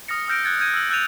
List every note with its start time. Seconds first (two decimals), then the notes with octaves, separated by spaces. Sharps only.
0.08 D#6 F6 A#6 C#7
0.28 E6 F6 G6 A#6 D7
0.44 F#6 G#6 A6 C#7
0.60 F6 G6 G#6 D#7
0.74 E6 F6 F#7
0.90 E6 F#6 G6 A6 D#7 F7